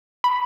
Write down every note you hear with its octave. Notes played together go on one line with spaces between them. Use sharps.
B5